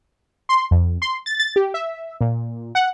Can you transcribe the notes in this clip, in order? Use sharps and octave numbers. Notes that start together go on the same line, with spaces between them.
C6
F2
C6
A6
A6
G4
E5
A#2
F#5